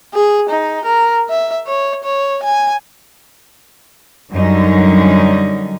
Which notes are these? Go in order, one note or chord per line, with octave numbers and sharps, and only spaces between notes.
G#4
D#4
A#4
E5
C#5
C#5
G#5
F#2 D3 F#3 G3 C#4 D#4